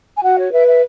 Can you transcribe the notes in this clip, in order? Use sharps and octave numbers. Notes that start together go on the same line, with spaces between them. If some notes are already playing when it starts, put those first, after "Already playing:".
G#5
F#4 F#5
C#5
B4 E5
E5